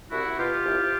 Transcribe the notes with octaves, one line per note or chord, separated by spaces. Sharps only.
C2 E4 F#4
B2 F4 G4
C2